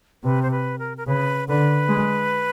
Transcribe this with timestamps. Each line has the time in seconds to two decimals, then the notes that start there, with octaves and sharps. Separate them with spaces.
0.24 C3 B4
0.42 C5
0.51 B4
0.79 A#4
0.97 A#4
1.07 C#3 B4
1.48 D3 B4
1.89 G#3